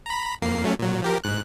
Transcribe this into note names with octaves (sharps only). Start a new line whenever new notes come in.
A#5 B5
F2 A#3 C7
F#3 A3 C#4
A#2 F#3
F3 G4 A#4
G#2 F#6